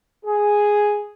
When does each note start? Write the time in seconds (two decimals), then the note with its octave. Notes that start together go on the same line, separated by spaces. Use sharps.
0.24 G#4